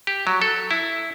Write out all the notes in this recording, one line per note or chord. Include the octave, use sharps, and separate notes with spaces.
G4
F#3
A4
E4